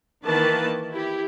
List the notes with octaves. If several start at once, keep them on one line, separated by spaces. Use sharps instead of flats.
D#3 E3 A#3 B4 A5
E4 G4